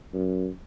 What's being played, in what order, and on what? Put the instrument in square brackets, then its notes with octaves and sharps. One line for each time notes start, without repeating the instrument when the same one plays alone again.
[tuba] F#2